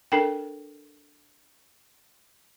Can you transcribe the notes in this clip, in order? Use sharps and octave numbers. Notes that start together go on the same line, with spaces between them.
D4 A4 A#4 G5